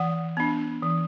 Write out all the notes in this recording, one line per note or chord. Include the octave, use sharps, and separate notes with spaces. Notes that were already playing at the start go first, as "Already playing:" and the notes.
Already playing: E3 F#5
B3 D4
E3